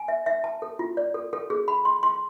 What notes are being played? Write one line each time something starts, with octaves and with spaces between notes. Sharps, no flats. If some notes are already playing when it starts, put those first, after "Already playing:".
Already playing: G#5
E5
E5
A5
A4
F4
D5
A4
A4
G#4
B5
C6
C6